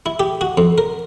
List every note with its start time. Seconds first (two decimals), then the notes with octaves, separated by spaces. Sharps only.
0.06 E4
0.20 G4
0.41 F#4
0.57 F2
0.78 A#4